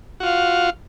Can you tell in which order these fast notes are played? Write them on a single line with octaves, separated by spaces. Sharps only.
F#4 F4 F5